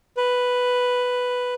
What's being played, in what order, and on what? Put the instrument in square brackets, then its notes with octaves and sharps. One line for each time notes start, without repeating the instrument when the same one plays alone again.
[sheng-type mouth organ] B4